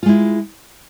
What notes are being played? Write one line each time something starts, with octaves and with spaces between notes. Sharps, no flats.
G#3 E4 F4